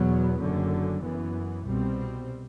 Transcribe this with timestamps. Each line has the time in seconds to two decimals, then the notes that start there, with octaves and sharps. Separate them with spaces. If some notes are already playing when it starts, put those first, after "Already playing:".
Already playing: E2 B2 F#3 B3
0.39 F#1 F#2 D3 F#3
1.02 F#2 E3 B3
1.64 C2 B2 G3 C4